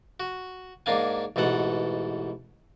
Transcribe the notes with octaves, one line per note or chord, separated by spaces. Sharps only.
F#4
G#2 A#3 D4 F5 G#5
A1 G#2 B2 A4 F#5